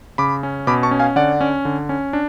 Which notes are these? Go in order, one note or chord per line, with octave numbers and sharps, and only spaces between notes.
C#3 B5 D6
C#4
B2 B5 D6
A5 C#6
C#4
F5 G#5
D3 D5 F#5
C#4
D3
C#4
D4